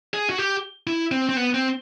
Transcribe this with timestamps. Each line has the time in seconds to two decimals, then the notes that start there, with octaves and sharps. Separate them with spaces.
0.14 G#4
0.30 F#4
0.38 G4
0.87 E4
1.12 C4
1.29 C4
1.37 B3
1.54 C4